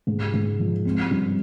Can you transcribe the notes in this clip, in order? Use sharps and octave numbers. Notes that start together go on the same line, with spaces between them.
G#2
G#2
F3
C4
G2